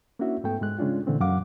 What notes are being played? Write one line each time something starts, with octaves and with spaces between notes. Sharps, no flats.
A#3 C#4 D4 E4 F#4 E5
G#2 A3 B3 A4 G5
G#2 G#3 F#6
C#3 G#3 C#4 D4 F4
A#2 D3 E3 A3 C4
F#2 F#3 F5 F#5 D6